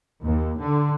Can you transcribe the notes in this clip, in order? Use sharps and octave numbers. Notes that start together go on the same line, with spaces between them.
D#2
D3